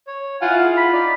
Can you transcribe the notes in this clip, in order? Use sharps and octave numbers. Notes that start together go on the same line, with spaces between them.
C#5
E4 F4 F5 F#5 G#5
G#4
B5
D#4 D5